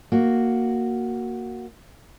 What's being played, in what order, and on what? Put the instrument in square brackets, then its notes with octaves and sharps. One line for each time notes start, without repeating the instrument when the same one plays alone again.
[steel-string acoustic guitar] A#3 F#4